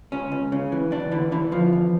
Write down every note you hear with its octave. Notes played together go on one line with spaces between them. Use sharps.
C#2 C#4
C#2
C#3
E3
E2 D4
D3 E3
D3 E3
E2 F3
E2